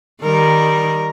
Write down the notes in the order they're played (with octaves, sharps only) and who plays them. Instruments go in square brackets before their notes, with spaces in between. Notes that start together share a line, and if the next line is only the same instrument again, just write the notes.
[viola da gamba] D#3 G3 [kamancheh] A#4